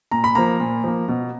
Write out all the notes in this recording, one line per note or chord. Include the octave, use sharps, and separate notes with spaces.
A#2 A#5
B5
F3 A#3 A#5
A#2
F3 A#3
B2